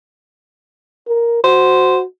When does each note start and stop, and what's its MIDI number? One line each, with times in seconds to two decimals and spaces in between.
1.08 1.43 70
1.44 2.04 66
1.44 1.98 72